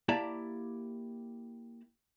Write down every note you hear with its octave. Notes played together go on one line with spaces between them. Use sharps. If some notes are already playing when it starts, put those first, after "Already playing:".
A#3 E4 G4 D5 A5 A#5